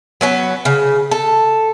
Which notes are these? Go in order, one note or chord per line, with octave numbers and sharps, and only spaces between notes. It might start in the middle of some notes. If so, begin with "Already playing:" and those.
F#3 B3 C#4
C#3
A4